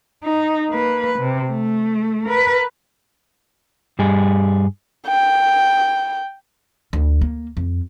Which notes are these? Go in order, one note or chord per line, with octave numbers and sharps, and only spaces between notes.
D#4
A#3 B4
C3
A3
A#4 B4
G2 G3 G#4
G5
D2
A#3
F2